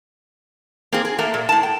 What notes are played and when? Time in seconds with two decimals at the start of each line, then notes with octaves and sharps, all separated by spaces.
0.92 A#3 C4 G#4
1.05 G#4
1.18 A3 A#3 A#4
1.34 A#2
1.49 A2 A5
1.63 G5